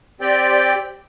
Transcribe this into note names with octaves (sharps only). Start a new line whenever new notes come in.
C4 G4 D5 G5